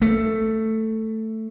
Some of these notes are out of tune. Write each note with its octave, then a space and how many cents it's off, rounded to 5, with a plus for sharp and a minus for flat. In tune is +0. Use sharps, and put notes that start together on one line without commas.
A3 +5